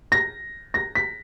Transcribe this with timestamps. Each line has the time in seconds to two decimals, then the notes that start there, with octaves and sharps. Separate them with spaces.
0.12 A#6
0.74 A#6
0.95 B6